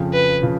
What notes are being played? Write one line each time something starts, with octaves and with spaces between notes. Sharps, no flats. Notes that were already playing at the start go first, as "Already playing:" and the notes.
Already playing: F2 C#3 F3
B4
C#3 F3